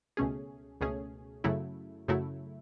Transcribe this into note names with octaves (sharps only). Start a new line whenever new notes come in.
C#2 B2 A3 C#4 G#4
C#2 B2 A3 C#4 G#4
F#2 C#3 F#3 A3 E4
F#2 C#3 F#3 A3 E4